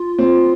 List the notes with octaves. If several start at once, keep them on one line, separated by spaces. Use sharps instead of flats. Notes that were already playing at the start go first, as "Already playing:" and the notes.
Already playing: F4
C4